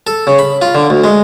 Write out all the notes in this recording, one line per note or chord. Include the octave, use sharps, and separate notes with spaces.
A4
C#3
B5
F4
D3
D2
G#3